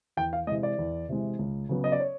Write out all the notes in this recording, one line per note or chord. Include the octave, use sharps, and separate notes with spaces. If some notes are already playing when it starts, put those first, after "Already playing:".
E2 G5
F5
C3 E3 G#3 D#5
D5
E2
C3 E3 G#3
C#2
C#3 F#3 B3
D#5
D5
C#5